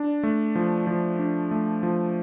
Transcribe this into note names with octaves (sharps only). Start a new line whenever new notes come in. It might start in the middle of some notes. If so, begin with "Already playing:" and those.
Already playing: D4
A3
F3
F3
D4
A3
F3